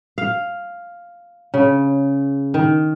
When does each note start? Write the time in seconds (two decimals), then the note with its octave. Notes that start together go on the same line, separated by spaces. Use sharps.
0.18 F5
1.54 C#3
2.54 D#3